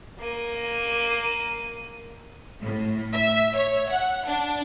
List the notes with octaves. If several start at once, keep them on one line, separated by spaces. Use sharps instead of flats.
A#3 D#7
A2
E5
C#5
F#5
D4